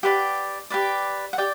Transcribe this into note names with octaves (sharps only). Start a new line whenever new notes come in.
G4 B4 D5 F#5
G4 B4 D5
F#5
G4 D5 G5